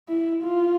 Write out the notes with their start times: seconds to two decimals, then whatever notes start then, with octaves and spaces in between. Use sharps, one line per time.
0.09 E4
0.43 F4